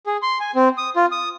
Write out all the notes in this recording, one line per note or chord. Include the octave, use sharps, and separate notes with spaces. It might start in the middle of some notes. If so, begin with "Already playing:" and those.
G#4
C6
G#5
C4
D#6
F4
D#6